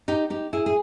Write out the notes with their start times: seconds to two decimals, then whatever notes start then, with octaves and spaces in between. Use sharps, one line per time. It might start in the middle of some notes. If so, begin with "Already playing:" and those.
0.08 D#4 G4
0.30 D#4 G4
0.53 E4 G#4
0.66 G#4